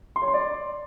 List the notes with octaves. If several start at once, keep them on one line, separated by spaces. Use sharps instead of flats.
C6
C#5
C6
D5